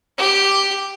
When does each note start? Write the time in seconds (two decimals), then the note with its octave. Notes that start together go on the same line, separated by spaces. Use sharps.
0.18 G4